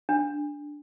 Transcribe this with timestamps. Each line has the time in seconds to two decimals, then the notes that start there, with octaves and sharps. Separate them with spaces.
0.09 D4